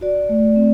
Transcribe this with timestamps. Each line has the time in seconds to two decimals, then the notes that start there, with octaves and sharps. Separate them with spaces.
0.01 F#4 D5
0.29 A3
0.56 C4